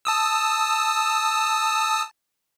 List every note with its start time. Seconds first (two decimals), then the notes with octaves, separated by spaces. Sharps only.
0.05 A5 D#6 E6